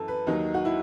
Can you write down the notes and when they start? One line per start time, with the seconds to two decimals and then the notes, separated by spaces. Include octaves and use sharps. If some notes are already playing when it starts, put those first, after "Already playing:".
Already playing: F#2 E3 A4
0.08 B4
0.27 D#2 D#3 F#3 D#4
0.54 F#4
0.65 E4